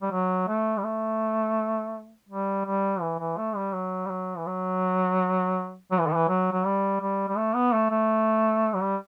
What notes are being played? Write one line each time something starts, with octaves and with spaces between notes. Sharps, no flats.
G3
F#3
A3
G3
A3
G3
G3
E3
E3
A3
G3
F#3
G3
F#3
E3
F#3
F#3
E3
D#3
E3
F#3
F#3
G3
G3
G3
A3
B3
A3
A3
F#3
G3